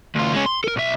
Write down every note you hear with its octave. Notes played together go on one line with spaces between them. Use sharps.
D2 F4
G#3 C#4
C6
A4 A#4
B1 E5